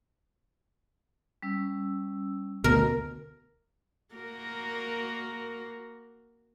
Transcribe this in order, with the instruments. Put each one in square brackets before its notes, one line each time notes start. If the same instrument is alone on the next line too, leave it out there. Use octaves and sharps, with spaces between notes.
[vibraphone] G3 C#4 E6
[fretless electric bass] D2 B2 [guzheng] A#4
[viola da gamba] A#3 F#4 A#4